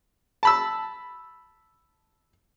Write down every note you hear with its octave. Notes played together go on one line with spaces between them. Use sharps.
A5 B5 E6